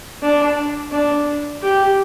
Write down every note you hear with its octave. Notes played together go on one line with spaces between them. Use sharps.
D4
D4
G4